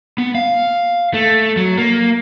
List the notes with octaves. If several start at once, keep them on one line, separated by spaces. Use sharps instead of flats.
B3
F5
A3
F#3
A#3